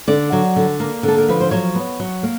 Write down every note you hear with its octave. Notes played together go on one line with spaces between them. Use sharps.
D3 D5
F#3
D3
A#3
D3
A4
A#4
F3 B4
C5
F#3 C#5
B3
F#3
A#3